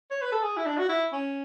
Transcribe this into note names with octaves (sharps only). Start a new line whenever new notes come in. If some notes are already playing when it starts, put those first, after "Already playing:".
C#5
B4
A4
G#4
E4
D4
F#4
E4
C#4